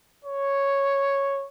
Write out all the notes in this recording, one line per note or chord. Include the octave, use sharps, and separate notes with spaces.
C#5